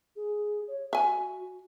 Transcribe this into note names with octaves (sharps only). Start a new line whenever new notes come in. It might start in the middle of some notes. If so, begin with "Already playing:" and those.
G#4
C#5
F#4 E5 G#5